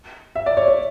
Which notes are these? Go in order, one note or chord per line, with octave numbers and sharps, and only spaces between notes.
E5
D5
C#5
C#5